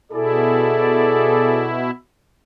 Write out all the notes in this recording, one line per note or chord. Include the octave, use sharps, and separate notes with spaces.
B2 E4 G#4 A4 D5